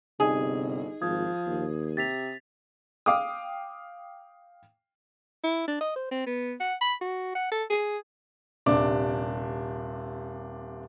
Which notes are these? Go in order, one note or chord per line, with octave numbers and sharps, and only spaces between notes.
G1 C3 D#4 G#4 D#5
G#1 F3 D#6 G#6
D#2
C3 A6 B6 F7
F5 G5 D6 D#6
E4
D4
D#5
C5
C4
B3
F#5
B5
F#4
F#5
A4
G#4
D#1 C3 D4 D6